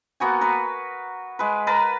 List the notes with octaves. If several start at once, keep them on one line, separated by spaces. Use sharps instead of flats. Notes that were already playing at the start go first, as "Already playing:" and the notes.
A#3 B3 F#4 G#5
A#4 B4
G#3 B4
A#4 B4 A5 A#5